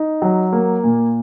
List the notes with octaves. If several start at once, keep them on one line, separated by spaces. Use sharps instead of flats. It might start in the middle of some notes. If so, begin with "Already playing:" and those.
Already playing: D#4
F#3
A#3
A#2